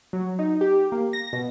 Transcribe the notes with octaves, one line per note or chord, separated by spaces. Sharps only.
F#3
D#4
G4
A#3
A#6
B2